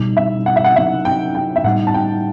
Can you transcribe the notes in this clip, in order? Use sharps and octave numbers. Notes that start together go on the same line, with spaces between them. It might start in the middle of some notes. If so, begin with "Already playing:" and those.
Already playing: B2 G3 D#4
E5
F#5
E5
F#5
C3 F#3 B3 D#4 E5
G5
G5
E5
A2 G3 D#4 F#5
A5
G5